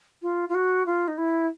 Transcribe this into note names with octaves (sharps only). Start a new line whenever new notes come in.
F4
F4
F#4
F4
D#4
E4